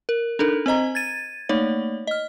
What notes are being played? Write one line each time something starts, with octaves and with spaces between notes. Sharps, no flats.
A#4
D4 D#4 A4 A#4
C4 C5 D#5 A#5
G#6 A6 D#7
A3 A#3 D#4 C#5 D5
D#5 F6